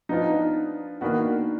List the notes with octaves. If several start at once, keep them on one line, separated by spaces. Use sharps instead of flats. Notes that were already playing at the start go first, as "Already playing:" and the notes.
F3 B3 D4 D#4 F4
D#3 A#3 B3 D4 F#4